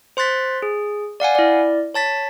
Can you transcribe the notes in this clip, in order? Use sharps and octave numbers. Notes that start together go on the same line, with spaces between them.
C5 C6 F#6 A6 B6
G#4
D5 F5 F#5 G#5
E4 D5
C#5 A5 A6 B6